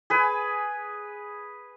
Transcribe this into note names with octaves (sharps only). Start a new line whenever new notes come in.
G#4 B4 G#5